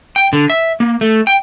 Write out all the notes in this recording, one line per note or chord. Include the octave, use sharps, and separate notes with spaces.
G5
D3
E5
A#3
A3
G5